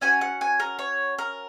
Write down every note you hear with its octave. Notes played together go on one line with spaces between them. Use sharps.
C#4 F#4 G#5
F#5
G#5
A#4
C#5
A#4